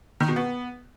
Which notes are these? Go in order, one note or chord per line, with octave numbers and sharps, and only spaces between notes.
D#3
B2
B3